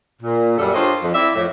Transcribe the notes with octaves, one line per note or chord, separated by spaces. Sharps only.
A#2
F#2 G3 A4
D4 F4 G4 C5 C#5 D#5
F2
C4 E4 D5 E5
F2 A2